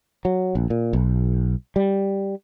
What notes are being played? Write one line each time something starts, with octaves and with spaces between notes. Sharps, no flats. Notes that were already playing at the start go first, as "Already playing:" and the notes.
F#3
A#1
A#2
B1
G3